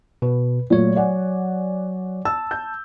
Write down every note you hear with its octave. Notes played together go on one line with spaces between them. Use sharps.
B2 B4
A#2 F#3 A3 C#5
D5 F#5 G#5
A5 E6
G6